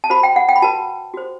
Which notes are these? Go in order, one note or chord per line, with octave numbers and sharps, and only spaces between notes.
A5
F#4 C5 B5
G5
F#5
G5
B5
F#4 B4 A5
F#4 C5